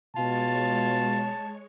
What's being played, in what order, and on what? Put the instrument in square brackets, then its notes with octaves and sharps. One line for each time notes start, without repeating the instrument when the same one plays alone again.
[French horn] B2 [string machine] G#3 C#5 [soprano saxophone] F4 [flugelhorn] A5